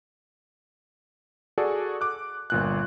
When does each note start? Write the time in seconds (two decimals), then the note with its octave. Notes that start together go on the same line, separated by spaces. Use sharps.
1.58 F#4 G#4 A4 D5
2.01 D6 F#6
2.50 G1 A#2 F#6